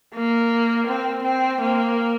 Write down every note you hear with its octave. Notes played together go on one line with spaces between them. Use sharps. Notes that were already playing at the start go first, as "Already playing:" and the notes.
A#3
C4
C4
A#3